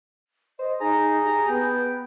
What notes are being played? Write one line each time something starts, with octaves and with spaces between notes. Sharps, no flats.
C5 D#5
D#4 G#4 A#5
G4
B3 G5